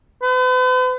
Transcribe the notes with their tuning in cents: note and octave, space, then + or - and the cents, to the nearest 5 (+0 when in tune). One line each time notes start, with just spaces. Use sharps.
B4 +45